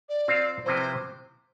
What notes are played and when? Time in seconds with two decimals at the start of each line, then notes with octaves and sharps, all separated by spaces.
0.09 D5
0.28 C4 F4 C5 F5
0.65 C3 F3 C4 E4 B4 C5